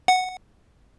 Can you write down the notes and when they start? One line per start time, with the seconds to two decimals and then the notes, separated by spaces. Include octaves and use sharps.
0.08 F#5